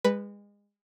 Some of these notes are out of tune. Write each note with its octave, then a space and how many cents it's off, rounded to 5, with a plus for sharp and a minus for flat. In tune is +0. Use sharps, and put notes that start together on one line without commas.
G#3 -30 B4 +0